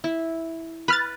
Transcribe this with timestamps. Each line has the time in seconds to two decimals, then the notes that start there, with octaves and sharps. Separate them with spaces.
0.04 E4
0.88 B4 B5 F6 A6